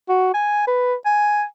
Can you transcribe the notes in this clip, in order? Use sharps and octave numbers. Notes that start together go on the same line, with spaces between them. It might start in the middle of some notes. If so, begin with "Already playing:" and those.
F#4
G#5
B4
G#5